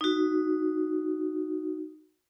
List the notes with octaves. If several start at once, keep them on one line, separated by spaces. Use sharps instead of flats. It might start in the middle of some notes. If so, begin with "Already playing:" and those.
D#4 F#4